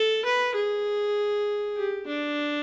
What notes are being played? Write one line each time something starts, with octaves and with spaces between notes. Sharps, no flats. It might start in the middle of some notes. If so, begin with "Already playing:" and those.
Already playing: A4
B4
G#4
G4
D4